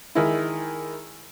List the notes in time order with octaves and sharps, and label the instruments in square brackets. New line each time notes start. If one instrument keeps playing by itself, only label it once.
[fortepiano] D#3 G#3 E4